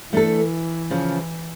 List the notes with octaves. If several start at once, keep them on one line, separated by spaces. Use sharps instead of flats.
E3 A3 D4 A4
C#3 F3 C#4